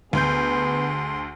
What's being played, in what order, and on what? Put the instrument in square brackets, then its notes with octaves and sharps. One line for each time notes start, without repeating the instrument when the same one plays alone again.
[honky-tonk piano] D2 G6 [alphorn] B3 [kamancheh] G#4 C6